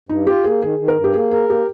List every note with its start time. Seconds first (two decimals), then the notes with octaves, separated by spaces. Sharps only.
0.09 G2 D#4
0.27 F4 G4
0.44 A#3 G#4
0.62 D#3 G#4
0.79 D#3
0.88 A#4
0.96 G2
1.04 G4
1.14 A#3 G#4
1.31 G#4 A#4
1.49 A#3 G4